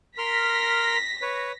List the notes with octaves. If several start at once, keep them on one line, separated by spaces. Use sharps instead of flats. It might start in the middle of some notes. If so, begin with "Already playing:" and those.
A#4 C6 F6 A#6 B6
B4 C#5